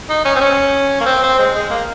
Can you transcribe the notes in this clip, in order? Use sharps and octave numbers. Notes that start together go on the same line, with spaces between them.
D#4
C#4
C4
C#4
A#3
C4
C4
G#3
G#3
A#3